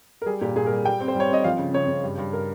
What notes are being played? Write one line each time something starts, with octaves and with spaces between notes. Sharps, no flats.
A#4
G3 G#4
A#2 G4
A#2 G#4
A#4
G3
G3 G5
C4
C5
G3 C#5
C4 D#5
F3 F5
C#3
C#3 C#5
C#3
G2
G2
A#4